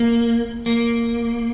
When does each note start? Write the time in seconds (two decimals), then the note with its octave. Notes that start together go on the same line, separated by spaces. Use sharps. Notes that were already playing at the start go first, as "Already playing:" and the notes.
Already playing: A#3
0.66 A#3